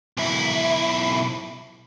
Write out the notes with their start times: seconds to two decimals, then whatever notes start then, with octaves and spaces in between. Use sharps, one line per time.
0.17 B1 E4